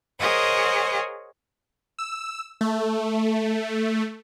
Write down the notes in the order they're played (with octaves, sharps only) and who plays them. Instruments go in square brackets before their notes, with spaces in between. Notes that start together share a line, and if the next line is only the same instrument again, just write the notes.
[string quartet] G#4 A#4 C5 C#5 D#5 F#5
[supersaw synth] E6
A3